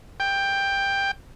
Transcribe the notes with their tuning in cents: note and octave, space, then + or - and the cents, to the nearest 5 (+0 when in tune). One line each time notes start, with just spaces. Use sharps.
G5 +10